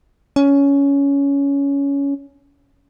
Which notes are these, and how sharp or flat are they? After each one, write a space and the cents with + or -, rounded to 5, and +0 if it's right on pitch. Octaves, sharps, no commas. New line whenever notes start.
C#4 +15